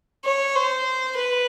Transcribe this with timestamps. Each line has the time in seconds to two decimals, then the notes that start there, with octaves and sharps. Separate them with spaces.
0.25 C#5
0.56 C5
1.17 B4